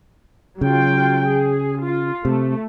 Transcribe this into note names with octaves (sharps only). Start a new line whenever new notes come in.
C#3 F#3 F4 G5
G#4
F4
C3 A3